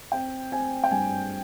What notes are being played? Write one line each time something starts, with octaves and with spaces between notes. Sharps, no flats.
C4 G5
C4 G#5
G5
G2 G#5